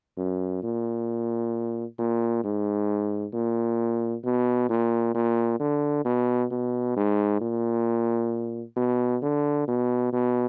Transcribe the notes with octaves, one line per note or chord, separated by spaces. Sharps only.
F#2
A#2
A#2
G#2
A#2
B2
A#2
A#2
D3
B2
B2
G#2
A#2
B2
D3
B2
B2